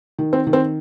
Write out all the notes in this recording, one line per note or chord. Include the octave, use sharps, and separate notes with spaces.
D#3
C4
D#3
C4